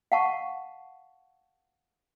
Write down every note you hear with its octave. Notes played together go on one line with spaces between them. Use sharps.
F5 F#5 A5 C#6